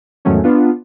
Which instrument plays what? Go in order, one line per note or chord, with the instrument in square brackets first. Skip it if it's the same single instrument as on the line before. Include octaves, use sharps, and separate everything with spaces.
[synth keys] E2 G#2 D#3 F#3 A3 C#4
B3 D4 F4